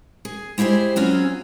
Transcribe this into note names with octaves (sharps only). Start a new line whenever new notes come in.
G#4
G#3 E4 G4 G#4 C5
F#3 C4 C#4 E4 F4 G#4